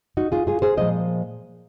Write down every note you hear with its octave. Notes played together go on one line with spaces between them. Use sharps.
D#4 F#4
F4 G#4
F4 G#4
G#4 C5
A#2 F3 G#3 C5 D#5